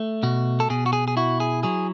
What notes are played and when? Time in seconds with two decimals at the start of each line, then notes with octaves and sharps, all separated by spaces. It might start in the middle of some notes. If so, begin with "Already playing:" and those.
Already playing: A3
0.23 B2 F#4
0.60 A4
0.70 B2 G#4
0.86 F#4
0.93 G#4
1.08 G#4
1.17 E4 F#4
1.40 G#4
1.63 F#3 G#4